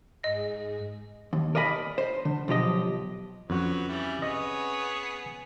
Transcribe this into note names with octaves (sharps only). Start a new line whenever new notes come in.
G#2 G#4 D#5 A#6
D#2
A#4 D5 D#5 F#5 B5
C5
D3
B1 F3 G4 D#5
F2 F#3 C4 C#4 F#4 B4
E3 G3 E4
B3 G#4 C#5 D#5